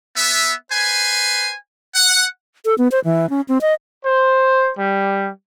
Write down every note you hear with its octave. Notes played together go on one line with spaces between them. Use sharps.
B3 E5
B4 C5 G#5
F#5
A4
B3
C5
E3
C#4
C4
D#5
C5
G3